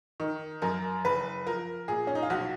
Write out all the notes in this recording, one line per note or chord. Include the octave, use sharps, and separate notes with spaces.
D#3
F#2 A#4
F#1 B4
F3 A#4
A#2 G#4
C#4
D#4
F4
B1 F#4